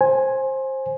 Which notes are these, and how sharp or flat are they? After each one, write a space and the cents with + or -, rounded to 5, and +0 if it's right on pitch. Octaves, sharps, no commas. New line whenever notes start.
C5 +20 G#5 +0